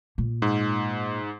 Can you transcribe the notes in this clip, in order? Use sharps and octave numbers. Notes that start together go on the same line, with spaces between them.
A#2
G#2